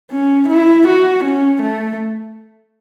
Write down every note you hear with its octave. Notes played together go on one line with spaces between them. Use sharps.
C#4
E4
F#4
C#4
A3